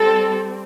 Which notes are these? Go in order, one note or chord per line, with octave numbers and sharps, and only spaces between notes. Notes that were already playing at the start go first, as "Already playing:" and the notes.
Already playing: G3 C4 A4